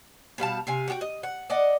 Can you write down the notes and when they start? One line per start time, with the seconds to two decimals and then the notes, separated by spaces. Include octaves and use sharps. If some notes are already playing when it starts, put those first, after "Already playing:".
0.38 B2 G3 F5 A5
0.67 C3 F5 G#5
0.88 F#4 G4 G5
1.01 D#5
1.23 F#5
1.50 D5 D#5 F#5